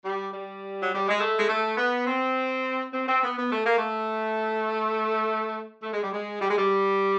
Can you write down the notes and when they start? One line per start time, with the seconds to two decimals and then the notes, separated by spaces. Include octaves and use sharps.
0.05 G3
0.33 G3
0.82 F#3
0.94 G3
1.08 G#3
1.20 A3
1.39 G#3
1.48 A3
1.77 B3
2.07 C4
2.93 C4
3.08 C4
3.23 B3
3.37 B3
3.51 A3
3.65 A#3
3.78 A3
5.83 A3
5.93 G#3
6.02 G3
6.12 G#3
6.41 G3
6.50 G#3
6.58 G3